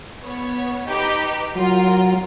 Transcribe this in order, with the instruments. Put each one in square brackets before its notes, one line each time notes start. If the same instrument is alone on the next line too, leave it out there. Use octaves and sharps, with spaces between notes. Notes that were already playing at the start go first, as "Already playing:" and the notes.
[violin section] B3 C#5
D#4 G4 B4
[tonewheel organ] F#3 [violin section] F4 A#4